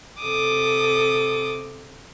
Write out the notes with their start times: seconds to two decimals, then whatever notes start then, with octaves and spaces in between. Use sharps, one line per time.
0.21 C3 A4 D6 D#6